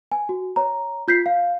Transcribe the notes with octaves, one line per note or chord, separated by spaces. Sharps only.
G#5
F#4
C#5 A#5
F4 G6 B6 C7
F5